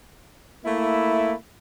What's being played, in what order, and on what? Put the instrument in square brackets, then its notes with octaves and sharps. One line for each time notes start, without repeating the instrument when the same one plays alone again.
[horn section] A3 A#3 E4